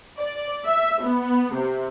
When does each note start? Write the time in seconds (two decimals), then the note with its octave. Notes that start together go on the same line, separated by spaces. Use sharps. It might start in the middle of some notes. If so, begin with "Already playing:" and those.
0.19 D5
0.66 E5
1.03 B3
1.54 C3